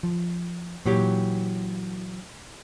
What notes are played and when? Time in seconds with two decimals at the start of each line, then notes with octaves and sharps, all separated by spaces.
0.03 F3
0.86 A#2 E3 F#3 G4